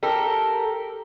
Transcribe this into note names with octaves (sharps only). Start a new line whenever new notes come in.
G4 A4 A#4